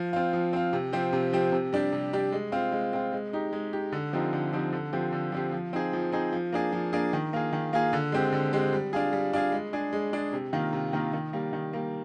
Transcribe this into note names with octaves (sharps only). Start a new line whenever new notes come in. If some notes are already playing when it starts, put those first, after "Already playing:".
Already playing: F3
C4 F4
F3
C4 F4
C3
F3 C4 G4
C3
F3 C4 G4
C3
G3 D4 G4
C3
G3 D4 G4
G#3
C4 F4
G#3
C4 F4
G#3
D#4 G4
G#3
D#4 G4
D3
F3 C4 D#4 G4
D3
F3 C4 D#4 G4
D3
F3 C4 G4
D3
F3 C4 G4
F3
C4 D#4 G#4
F3
C4 D#4 G#4
F3
A#3 D4 G#4
F3
A#3 D4 G#4
D#3
A#3 F4 G#4
D#3
A#3 F4 G#4
D3
G#3 C4 G4
D3
G#3 C4 G4
G3
D4 F4 G#4
G3
D4 F4 G#4
G#3
D4 G#4
G#3
D4 G#4
C3
D#3 A#3 F4
C3
D#3 A#3 F4
D#3
G3 A#3
D#3
G3 A#3